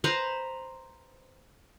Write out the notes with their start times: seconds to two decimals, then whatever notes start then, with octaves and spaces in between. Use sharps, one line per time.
0.04 B4 C5 A#5 C6